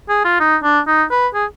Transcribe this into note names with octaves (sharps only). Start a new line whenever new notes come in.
G#4
F4
D#4
D4
D#4
B4
G#4